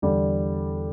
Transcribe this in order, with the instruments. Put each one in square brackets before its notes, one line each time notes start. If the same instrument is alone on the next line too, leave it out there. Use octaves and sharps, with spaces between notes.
[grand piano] E2 D3 G3 D4